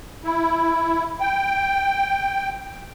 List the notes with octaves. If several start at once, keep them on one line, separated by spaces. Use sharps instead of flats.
E4
G5